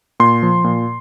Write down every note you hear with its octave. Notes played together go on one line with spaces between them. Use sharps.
A#2 C6
F3
A#2